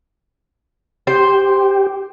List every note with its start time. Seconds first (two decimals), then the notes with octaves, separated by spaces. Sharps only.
1.07 G4 C5